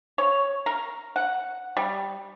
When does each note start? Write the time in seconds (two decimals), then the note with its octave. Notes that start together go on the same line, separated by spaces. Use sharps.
0.18 C#5
0.66 A#4
1.16 F#5
1.77 G3